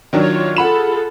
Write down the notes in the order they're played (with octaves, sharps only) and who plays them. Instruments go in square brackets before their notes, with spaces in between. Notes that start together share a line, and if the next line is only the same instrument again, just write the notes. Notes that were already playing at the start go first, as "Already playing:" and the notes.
[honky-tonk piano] D#3 F#3 D4 [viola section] F4 C#5
[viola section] F4 G#4 A4 [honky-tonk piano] F#5 B5 E7